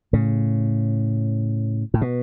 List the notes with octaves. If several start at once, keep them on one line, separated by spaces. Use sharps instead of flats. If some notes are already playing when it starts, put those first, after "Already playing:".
A2 C#3
A2
B2